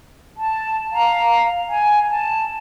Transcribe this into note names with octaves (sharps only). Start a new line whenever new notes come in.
A5
F5 A#5
G#5
A5